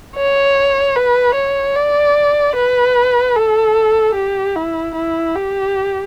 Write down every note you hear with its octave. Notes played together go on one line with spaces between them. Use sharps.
C#5
B4
C#5
D5
B4
A4
G4
E4
E4
G4